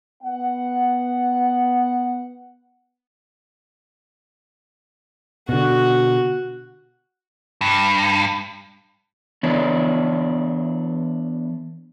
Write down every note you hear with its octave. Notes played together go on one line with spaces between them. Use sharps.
B3 F#5
B2 D3 F#4
G2
E3 B3 D4 C#5